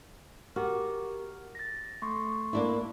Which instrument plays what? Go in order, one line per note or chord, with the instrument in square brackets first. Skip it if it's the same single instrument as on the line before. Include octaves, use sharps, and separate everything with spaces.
[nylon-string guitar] F#4 [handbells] G4 A#4
[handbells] A6 A#6
A3 C6 C#6
[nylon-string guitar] A#3 D4 E4